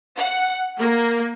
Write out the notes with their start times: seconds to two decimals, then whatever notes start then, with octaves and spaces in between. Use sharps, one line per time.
0.18 F#5
0.79 A#3